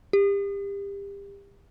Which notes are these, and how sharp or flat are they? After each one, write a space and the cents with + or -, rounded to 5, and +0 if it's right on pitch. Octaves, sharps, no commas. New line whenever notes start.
G4 +30